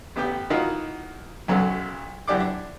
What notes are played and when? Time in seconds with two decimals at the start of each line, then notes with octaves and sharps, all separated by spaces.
0.16 A1 B3 G4
0.50 D#3 E3 D#4 F4 F#4
1.48 B1 F#2 C#3 F#3 A4 F#5
2.28 F#2 E3 G4 D5 F#5 D6
2.40 D4